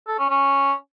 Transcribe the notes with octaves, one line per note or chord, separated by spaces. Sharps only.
A4
C#4
C#4